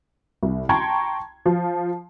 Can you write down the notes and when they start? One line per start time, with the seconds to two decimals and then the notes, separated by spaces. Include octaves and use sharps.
0.43 C2
0.69 G5 A5 A#5 C6 C#6 G#6
1.46 F3